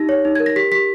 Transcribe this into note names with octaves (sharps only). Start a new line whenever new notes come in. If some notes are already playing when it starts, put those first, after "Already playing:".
Already playing: D#4 G4 A#6
C#5
D#4
A#4 G#6
A#6
G4 B6
G4 B6